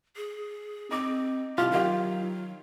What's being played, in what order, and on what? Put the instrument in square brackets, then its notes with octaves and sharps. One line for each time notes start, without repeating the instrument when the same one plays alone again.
[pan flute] G#4
[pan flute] C4 [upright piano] D#4 D6
[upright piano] C2 [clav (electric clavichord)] F4 [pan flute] G4
[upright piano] D#3 G4 F5 [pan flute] F#3